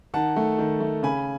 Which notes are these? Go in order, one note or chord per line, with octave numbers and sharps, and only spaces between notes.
D#3 F#5 A5
A3
D#3
A3
C#3 G#5 B5